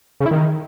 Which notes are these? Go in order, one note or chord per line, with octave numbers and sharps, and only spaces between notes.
C#3
E4
D#3